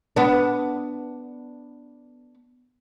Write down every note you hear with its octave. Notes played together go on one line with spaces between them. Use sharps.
B3 D4